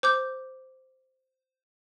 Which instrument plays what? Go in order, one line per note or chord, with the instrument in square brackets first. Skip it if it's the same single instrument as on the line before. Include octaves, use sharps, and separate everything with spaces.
[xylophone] C5 D6 G6